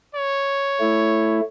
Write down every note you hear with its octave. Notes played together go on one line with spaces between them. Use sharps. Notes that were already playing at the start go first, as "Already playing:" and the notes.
C#5
A3 E4